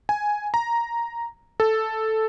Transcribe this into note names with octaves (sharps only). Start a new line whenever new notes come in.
G#5
A#5
A4